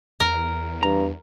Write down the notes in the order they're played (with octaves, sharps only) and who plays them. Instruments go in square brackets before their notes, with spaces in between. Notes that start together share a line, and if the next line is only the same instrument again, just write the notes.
[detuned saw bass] E2 [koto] A#4
[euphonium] G2 [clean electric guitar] A#5